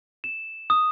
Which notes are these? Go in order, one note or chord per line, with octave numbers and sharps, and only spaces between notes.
E7
D#6